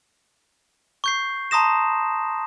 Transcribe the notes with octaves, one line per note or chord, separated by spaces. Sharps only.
C#6 G6 C7
A5 A#5 C6 D#6 A#6 E7